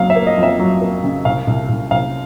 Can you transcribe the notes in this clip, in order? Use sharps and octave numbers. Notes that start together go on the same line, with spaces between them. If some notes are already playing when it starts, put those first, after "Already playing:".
Already playing: F2 C#3 F#3 F5
E5
A#3
D#5
F2
E5
F#3
A#3
C#3
C2 F5
C2
C2
C2 F5